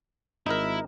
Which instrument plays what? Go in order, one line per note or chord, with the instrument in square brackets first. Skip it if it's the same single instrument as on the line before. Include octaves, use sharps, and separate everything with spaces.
[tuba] G#1 [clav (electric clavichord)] D#4 A#4 [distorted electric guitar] E4 E5